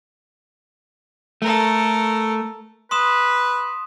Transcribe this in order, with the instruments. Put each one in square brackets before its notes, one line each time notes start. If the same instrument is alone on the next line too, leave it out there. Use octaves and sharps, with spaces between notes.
[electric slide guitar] A3 [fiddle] A4 A#4
[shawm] B4 [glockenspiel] C6 D#6 E7